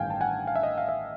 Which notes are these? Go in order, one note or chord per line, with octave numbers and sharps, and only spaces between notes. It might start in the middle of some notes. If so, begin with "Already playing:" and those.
Already playing: A1 G2 D#3 G3 F5 G5 G#5
A5
F#5 G#5
F5
E5
D#5 F5
F5
E5